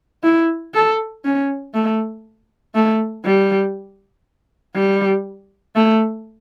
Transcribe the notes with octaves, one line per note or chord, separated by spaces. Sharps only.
E4
A4
C#4
A3
A3
G3
G3
A3